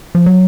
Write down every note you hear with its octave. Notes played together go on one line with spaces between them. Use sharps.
F3
F#3